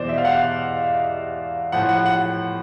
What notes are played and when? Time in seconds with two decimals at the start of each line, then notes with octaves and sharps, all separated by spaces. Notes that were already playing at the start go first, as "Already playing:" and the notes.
Already playing: E2 B2 C5 D5
0.09 E5
0.18 F5
0.25 F#5
1.72 A2 F3 F#5
1.89 F#5
2.06 F#5